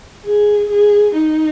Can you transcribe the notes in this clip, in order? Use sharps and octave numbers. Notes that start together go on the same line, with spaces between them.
G#4
G#4
D#4